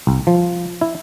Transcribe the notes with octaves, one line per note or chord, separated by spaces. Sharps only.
C2
F3
E4